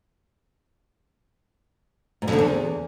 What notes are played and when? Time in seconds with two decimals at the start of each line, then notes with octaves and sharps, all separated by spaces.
2.22 G#2
2.28 F2
2.33 D3
2.39 E2